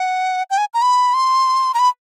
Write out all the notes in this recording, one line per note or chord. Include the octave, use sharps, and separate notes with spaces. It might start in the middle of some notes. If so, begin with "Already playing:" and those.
Already playing: F#5
G5
G#5
A#5
B5
C6
A#5
B5